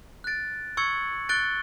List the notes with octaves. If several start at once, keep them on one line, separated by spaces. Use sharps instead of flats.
F#6 A6 D7
C#6 E6 G#6 C#7 F#7
F#6 A6 D7 G7